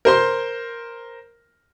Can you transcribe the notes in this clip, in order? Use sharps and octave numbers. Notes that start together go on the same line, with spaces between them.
A#4 C5 C6